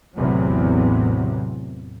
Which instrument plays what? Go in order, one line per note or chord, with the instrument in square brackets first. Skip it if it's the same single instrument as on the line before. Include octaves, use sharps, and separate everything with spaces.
[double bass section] A1 E2 C3 F#3